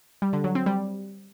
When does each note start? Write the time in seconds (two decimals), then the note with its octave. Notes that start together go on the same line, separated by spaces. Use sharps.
0.22 G3
0.33 D3
0.44 F#3
0.55 C4
0.66 G3